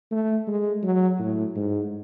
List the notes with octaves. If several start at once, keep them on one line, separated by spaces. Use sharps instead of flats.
A3
G#3
F#3
A2
G#2